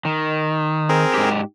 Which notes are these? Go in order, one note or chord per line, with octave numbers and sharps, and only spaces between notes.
D#3
C4 G#4 A#4
G#2 G4